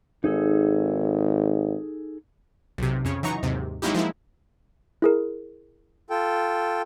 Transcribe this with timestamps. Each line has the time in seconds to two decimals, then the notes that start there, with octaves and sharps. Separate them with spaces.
0.24 G#1 D#4 G#4 A4
2.78 B1 C3
3.05 F2 C#3 C#5
3.23 E3 F#3 D#4 A#5 C#6
3.43 D#2 G#2 C3
3.82 F#3 G#3 A#3 D#4 E4 G4
3.94 F3 G#3 D#4 E4
5.02 E4 G#4 A#4
6.10 F4 A4 G5